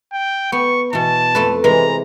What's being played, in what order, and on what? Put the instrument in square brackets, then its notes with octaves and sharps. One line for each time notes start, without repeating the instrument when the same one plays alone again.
[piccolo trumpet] G5
[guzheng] B3 [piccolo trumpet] C#6
[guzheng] B2 E3 [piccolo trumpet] A5
[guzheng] F2 A3 B4
[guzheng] C3 E3 G#3 [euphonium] B4 [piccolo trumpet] A#5